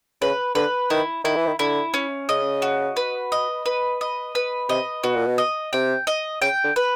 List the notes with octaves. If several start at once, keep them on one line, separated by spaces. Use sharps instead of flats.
C#3 B4
D3 B4
D#3 E4
D#3 E4
E3
D#3
D3 E4
C#4
C#3 D#5
F#4
B4
D#5
B4
D#5
B4
C3 D#5
B2 F#4
A#2
B2
D#5
C3 G5
D#5
C#3 G5
D3
B4